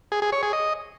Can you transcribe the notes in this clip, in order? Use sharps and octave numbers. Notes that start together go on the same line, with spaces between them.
G#4
G#4
C#5
G#4
D#5